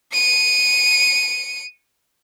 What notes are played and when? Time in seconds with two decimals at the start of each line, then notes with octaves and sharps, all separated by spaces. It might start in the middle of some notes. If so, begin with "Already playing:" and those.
0.13 C#7 D#7